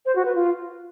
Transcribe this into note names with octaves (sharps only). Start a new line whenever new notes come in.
C5
F#4
B4
F4